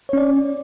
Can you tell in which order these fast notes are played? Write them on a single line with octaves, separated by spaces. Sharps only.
C#5 C#4 D5